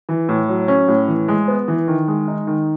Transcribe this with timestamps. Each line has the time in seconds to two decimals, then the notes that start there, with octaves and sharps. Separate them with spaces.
0.09 E3
0.29 A2
0.48 F#3
0.68 C#4
0.88 A2
1.08 E3
1.28 G#3
1.48 B3
1.68 E3
1.88 D#3
2.08 G#3
2.28 D#4
2.47 D#3